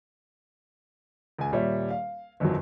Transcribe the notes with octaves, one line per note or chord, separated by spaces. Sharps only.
C#2 G#5
D#1 A#2 G3 C#5 E5
F5
G1 F2 D#3 F#3